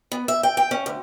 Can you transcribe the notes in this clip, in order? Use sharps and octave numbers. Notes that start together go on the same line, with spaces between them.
B3
E5
G5
G5
C#4
D2